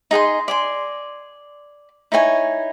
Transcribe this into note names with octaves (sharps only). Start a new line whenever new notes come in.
D#4 G#4 F#5 C6
D5 G#5 C6
D#4 E4 C#5 G#5